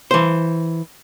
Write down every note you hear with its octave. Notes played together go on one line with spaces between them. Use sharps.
E3 C5